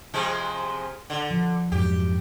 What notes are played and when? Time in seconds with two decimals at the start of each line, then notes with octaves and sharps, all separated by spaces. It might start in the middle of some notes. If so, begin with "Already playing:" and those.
0.14 C3 F3 G#3
1.10 D3
1.31 F3
1.72 F2 G#2 F#3 G4